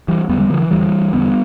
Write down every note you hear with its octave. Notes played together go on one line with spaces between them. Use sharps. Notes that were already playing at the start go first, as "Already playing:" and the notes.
E3 G3
E2 D3 G3 B3
G3 B3
D3 F3
E3
E2 D3 E3 G3
E2 D3 G3 B3